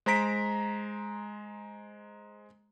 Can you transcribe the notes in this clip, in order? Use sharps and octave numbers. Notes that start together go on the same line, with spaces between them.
G#3 C5 A#5 B6 D7